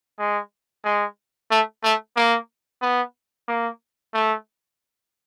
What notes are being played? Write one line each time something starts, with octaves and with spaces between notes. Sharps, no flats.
G#3
G#3
A3
A3
A#3
B3
A#3
A3